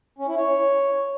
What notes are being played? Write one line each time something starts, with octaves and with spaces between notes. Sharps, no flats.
C#4
E4
C#5